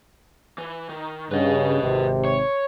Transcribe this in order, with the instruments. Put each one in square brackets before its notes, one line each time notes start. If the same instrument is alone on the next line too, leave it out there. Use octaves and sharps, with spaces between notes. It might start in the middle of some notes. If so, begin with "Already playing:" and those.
[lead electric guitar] E3
D#3
[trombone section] G2 C#3 [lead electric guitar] B4 D#5
[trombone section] G#1 C3
[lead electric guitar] C#5